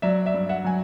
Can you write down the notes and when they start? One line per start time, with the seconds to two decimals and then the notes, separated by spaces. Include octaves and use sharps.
0.02 F#3 D5 E5
0.26 D5 E5
0.34 G2
0.49 E5 F#5
0.64 F#3 G#5